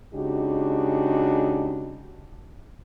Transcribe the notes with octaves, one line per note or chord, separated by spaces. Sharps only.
C#3 G#3 D4 D#4 F#4 G4